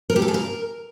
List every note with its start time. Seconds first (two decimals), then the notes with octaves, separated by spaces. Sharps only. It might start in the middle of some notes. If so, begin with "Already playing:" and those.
0.10 A#4
0.16 G4
0.22 A4
0.28 G#4
0.34 A#4